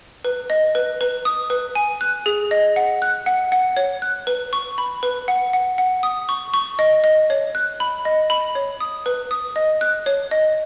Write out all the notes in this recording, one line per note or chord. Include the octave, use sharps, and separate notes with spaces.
B4
D#5
B4
B4
D#6
B4
G#5
F#6
G#4
D#5
F#5
F#6
F#5
F#5
C#5
F#6
B4
C#6
B5
B4
F#5
F#5
F#5
D#6
C#6
C#6
D#5
D#5
C#5
F#6
B5
D#5
B5
C#5
D#6
B4
D#6
D#5
F#6
C#5
D#5